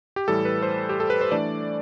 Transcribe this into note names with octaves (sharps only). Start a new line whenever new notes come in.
G4
A2 E3 G3 A4
B4
C5
G4
A4
B4
C5
E3 A3 D4 D5